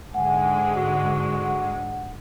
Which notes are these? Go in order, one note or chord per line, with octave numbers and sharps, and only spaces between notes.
G#2 D3 G#3 F#5 G#5
F#4